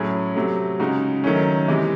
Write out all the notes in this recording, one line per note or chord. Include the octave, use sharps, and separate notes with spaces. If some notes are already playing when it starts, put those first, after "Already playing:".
Already playing: A2 F#3 C#4 G#4
C3 F#3 A3
C#3 G#3 D#4 F#4
D#3 F#3 A3 C#4
C3 E3 G#3